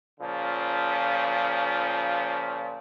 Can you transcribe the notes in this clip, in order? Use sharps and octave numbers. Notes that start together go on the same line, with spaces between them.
A#2 C#3 F3